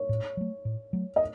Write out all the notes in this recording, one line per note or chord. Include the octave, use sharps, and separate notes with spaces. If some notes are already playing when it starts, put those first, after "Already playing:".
Already playing: C#5
A2
F#3 A3
A2
F#3 A3
D#5